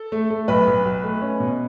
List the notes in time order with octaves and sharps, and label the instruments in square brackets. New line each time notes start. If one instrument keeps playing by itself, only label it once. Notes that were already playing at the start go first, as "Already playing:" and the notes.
Already playing: [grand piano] A4
A3
A3
B1 B4 B5
B1
B1
A3
C#4
B2